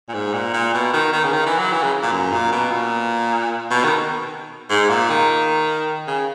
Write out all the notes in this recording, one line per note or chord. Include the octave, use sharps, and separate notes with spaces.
A#2
G#2
A#2
A#2
B2
D#3
D#3
C#3
D#3
E3
F#3
E3
C#3
A#2
F#2
A#2
B2
A#2
B2
D#3
G#2
A#2
D#3
C#3